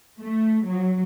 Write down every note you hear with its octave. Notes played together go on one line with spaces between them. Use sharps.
A3
F#3